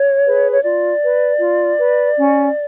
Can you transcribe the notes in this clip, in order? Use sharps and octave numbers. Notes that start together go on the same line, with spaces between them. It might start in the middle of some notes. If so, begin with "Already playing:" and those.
Already playing: C#5
G#4 B4
C#5
F4 D5
B4
F4
B4
C#4